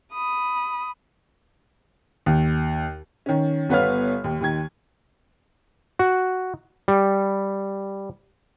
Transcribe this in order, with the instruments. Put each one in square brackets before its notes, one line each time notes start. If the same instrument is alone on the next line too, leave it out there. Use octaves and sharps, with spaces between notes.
[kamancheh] B5 D#6
[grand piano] D#2
[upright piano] D#3 C#4
G1 B3 B4 C#5 F5 F6
D#2
D#2 D#3 G#6
[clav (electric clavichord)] F#4
G3